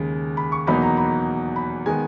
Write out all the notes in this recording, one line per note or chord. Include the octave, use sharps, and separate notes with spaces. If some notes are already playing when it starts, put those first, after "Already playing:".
Already playing: D#2 C#3 G#3
B5
C#6
E2 B2 F#3 A#3 D#4 B5
A#5
B5
B5
D#3 G#3 B3 G#5